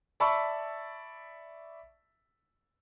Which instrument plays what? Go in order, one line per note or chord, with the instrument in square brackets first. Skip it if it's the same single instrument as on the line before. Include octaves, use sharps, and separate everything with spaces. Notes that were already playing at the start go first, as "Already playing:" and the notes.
[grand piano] D5 E5 A5 B5 C#6 E6